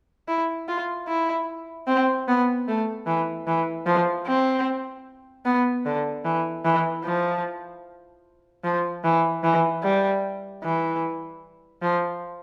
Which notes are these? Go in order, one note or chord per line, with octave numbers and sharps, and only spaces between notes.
E4
F4
E4
C4
B3
A3
E3
E3
F3
C4
B3
D3
E3
E3
F3
F3
E3
E3
G3
E3
F3